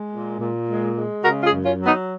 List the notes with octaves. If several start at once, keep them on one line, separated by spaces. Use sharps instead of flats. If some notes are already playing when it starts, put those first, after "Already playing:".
Already playing: G#3
A#2
A#2
G#3
G#3
C#3 F#4 A#4
F4 G#4
F#2
C#4 F4
F#3
B3 D#4